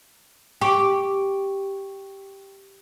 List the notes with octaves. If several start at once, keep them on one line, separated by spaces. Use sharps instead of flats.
G4 G5 C#6